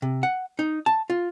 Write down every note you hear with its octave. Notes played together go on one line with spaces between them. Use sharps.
C3
F#5
D#4
A5
F4